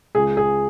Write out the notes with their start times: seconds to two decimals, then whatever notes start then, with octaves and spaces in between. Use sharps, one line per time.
0.15 C#2 G#4
0.37 G#4